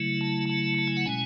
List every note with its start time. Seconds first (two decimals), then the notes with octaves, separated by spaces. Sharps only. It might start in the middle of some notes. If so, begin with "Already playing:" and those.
Already playing: C#3 F#3 A3 E4
0.21 A5
0.49 A5
0.78 A5
0.87 G#5
0.97 F#5
1.06 B2 G#3 C#4 G#5